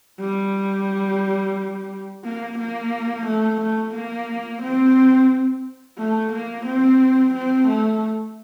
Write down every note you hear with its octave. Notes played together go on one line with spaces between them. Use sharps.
G3
A#3
A#3
A3
A3
A#3
C4
A3
A#3
C4
C4
A3